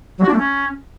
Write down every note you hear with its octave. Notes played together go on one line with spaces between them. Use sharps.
F#3
F#4
D4
A3
C#4